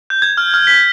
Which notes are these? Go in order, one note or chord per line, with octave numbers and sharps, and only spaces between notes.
G6
G#6
F6
F6
B6